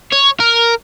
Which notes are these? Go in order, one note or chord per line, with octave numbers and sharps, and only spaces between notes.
C#5
A#4